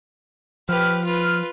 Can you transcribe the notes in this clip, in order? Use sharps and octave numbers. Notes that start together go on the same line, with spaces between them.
F3 G4 B4 F6
F4 B4